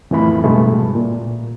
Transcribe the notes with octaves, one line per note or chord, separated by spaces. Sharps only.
F2 A2 E3 A3 B5
G2 B2 G#3 A3
A#2